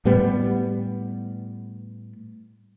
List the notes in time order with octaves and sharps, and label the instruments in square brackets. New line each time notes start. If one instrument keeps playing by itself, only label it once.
[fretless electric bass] A2 G3 B3